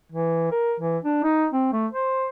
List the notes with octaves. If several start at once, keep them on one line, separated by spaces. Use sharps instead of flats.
E3
A#4
E3
D4
D#4
C4
A3
C5